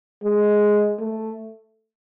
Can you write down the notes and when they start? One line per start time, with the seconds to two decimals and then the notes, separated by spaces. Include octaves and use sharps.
0.24 G#3
1.00 A3